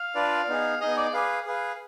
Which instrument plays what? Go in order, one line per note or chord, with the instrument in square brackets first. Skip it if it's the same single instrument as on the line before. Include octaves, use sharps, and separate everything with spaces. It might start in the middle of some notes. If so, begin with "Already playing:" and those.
Already playing: [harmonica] F5
[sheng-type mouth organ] D4 F4 B4 D5
B3 D#4 G#4
[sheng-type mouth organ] B3 D#4 G#4 [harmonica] D#5
[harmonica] D5
[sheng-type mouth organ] G#4 B4 F5
G#4 B4 F5